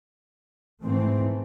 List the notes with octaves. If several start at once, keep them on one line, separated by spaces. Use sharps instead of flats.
G#2 E3 A3 C4